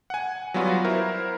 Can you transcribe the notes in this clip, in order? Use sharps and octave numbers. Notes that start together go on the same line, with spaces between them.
F#5 G#5
F#3 G3 B3 F4 F#4
E4 A#4 C5